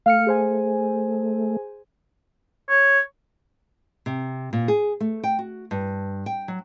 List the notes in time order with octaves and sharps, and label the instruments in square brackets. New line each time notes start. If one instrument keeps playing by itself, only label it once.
[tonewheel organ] A3 [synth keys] F5 F6 C#7
[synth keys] G#4 C5 G#5
[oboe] C#5
[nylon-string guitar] C3
A#2
G#4
A3
G5
F#4
G2
G5
F#3